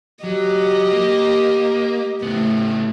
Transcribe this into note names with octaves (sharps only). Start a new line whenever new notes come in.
F#3 G4 D#5
A#3
A2 C#3 B3